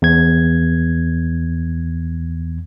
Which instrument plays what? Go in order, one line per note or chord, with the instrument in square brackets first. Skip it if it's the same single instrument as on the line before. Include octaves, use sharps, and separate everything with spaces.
[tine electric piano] E2 G#6